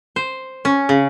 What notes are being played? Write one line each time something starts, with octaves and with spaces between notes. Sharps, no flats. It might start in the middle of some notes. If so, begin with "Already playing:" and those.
C5
C#4
C#3